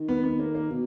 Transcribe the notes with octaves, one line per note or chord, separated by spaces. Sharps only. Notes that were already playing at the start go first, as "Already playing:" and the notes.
Already playing: D#3
B3
B3
A#3
A#3
B2